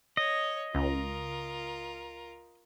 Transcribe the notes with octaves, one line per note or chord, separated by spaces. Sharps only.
C#5 D#5
C#2 F4 A#4